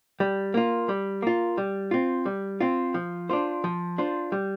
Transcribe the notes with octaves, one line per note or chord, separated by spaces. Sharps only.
G3
A#3 F4
G3
A#3 F4
G3
C4 F4
G3
C4 F4
F3
D4 F4 C5
F3
D4 F4 C5
G3